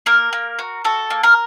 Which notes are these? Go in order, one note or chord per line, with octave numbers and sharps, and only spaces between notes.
A#3 A#4
A#3
F#4
F#4 A4
A#3
A#4